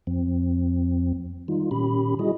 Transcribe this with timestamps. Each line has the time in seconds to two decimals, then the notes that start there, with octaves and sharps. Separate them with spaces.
0.07 F2 F3 C4
1.48 D#3 G3 D#4 F4
1.71 A#2 D#3 C#4 G4 B5
2.19 G3 E4 F#4 G#4 D#5